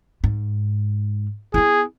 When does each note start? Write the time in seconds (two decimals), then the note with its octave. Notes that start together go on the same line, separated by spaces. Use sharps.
0.24 G#2
1.54 B3 E4 G#4